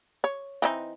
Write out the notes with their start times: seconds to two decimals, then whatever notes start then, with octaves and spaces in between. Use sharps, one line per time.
0.24 C#5
0.62 E3 C4 D#4